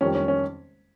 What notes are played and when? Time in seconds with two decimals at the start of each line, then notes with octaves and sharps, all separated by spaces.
0.01 F2 D#3 G3 C#4
0.15 C#4
0.28 C#4